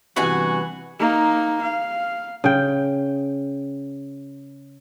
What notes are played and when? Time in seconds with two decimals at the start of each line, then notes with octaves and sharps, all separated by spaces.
0.16 C2 G2 E3 B3 F#4 G#5
0.99 A#3 D#4
1.62 F5
2.44 C#3 G5